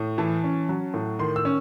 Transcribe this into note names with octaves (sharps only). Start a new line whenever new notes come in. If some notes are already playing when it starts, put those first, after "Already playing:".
Already playing: A2
E3 A5
C#4
F#3
A2
D#3 C6
E6
C#4